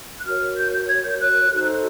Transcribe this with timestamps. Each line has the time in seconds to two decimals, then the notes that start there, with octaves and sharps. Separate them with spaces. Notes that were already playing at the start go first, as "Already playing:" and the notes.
0.19 F#6
0.25 F#4 A#4 C#5 F6
0.57 G6
0.73 G6
0.88 G#6
1.03 G6
1.20 F#6
1.51 D#4 F#4 A4 C5